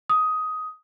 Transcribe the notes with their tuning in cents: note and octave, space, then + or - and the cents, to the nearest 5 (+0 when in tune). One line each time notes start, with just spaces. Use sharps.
D#6 +10